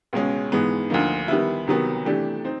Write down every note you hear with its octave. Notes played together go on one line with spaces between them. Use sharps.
C#2 B2 G#3 C#4
G#2 E3 G#3 B3
D2 D3 F3 A#3 D#4
D#3 G3 B3 E4
C2 C3 D#3 F#3 B3
C3 E3 A3 D4 G4
C4 D#4